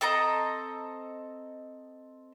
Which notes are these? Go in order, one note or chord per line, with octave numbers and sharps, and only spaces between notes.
C4 A4 D#5 A#5